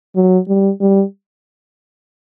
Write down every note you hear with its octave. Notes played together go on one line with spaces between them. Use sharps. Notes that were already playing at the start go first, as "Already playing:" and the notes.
F#3
G3
G3